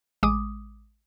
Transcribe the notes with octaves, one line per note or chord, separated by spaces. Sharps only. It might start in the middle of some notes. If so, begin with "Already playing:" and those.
A1 G#3 D6 D#6